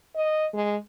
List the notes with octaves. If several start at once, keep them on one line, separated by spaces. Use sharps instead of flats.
D#5
G#3